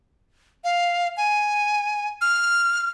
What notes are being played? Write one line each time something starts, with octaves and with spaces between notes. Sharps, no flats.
F5
G#5
F6